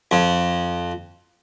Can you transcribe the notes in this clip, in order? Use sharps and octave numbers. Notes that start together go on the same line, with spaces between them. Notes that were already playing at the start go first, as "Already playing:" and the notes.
F2